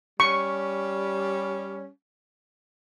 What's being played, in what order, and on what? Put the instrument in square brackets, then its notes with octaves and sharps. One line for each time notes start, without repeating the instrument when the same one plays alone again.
[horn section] G3 C#4 [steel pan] C#6